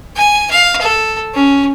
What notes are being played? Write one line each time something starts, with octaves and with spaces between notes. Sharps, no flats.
G#5
F5
A4
C#4